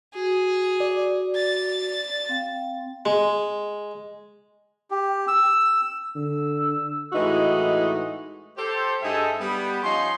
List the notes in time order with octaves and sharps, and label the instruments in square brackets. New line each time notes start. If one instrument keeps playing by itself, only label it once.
[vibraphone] F#4 [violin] G#4
[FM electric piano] D5
[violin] A6
[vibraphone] C4 F5 G5
[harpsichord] G#3
[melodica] G4
E6
[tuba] D3 [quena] E6
[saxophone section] A2 E3 G#3 D#4 F#4
[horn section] G4 A4 C5
G2 G#3 D#4 G#4 A4 E5
G3 B3
F3 C#4 D#4 C6